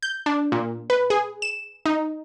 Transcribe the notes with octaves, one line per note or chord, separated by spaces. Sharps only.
G6
D4
A#2
B4
G#4
E7
D#4